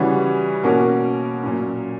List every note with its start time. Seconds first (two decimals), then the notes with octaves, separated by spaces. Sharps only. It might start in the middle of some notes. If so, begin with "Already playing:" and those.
Already playing: C#3 E3 G3 C#4 F#4
0.63 B2 A#3 C#4 F#4 A#4
1.43 A#2 F#3 C#4